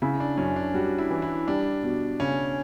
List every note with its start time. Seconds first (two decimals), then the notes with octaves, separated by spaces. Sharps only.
0.02 C#3 E4
0.20 D4
0.37 F#2 C#4
0.56 D4
0.74 G3 F#4
0.98 E4
1.11 E3
1.22 E4
1.48 G3 D4
1.83 B2
2.20 C#3 C#4